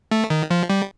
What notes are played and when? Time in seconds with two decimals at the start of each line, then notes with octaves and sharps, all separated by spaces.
0.11 A3
0.30 D#3
0.50 F3
0.70 G3